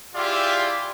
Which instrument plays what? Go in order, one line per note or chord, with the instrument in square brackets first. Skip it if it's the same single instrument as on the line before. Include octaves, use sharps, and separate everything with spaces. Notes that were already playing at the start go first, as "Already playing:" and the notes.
[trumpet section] E4 F4 G4 G#4 D5 E5